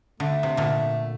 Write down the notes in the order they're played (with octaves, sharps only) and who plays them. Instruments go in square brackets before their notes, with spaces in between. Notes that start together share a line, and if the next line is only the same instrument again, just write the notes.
[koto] D3 [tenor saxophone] A3
[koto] C3
A#2 D3